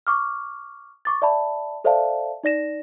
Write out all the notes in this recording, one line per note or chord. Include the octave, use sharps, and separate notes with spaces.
C#6 D6 F6
C#6 D6 A6
D5 E5 A5 B5
A4 C5 D5 E5 F5 A5
D#4 D5 A#6 E7